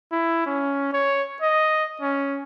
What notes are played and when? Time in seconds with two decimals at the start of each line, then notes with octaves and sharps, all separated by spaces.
0.12 E4
0.46 C#4
0.93 C#5
1.42 D#5
2.01 C#4